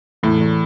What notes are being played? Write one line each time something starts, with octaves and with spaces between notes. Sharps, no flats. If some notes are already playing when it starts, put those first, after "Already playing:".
E2 A2
E2